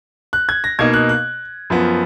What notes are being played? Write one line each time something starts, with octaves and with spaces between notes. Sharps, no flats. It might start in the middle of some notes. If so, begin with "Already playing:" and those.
F#6
G#6
A#6
B2 A#3 D#4 G#6
F#6
F#6
F#2 F3 B3